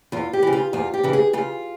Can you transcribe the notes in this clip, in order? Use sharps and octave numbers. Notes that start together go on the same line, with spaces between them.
E2 F4
G4
C#3 E3
F4
E2 F4
G4
C#3 E3
G#4
C#3 F4